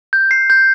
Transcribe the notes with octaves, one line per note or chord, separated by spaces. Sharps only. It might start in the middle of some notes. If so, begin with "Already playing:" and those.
G6
C7
G6